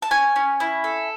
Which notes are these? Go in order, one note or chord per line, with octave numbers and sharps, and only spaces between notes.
A5
C#4 G#5
C#4
E4
A4